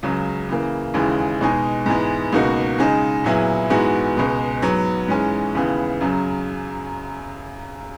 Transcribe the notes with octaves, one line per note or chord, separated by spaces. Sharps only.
C#2 C#3 F#3
C#3 E3 A#3
D#2 C#3 E3 G#3
B2 G#3 D#4 G#4
G#2 E3 G#3 B3
C#2 B2 A#3 D#4 F#4
C#3 G#3 D#4 G#4
A#2 F#3 B3 E4 G#4
G#2 E3 G#3 B3 F#4
C#2 B2 G#3
G#2 F#3 B3
G#2 E3 G#3 C#4
D#2 C#3 E3 B3
F#2 C#3 F#3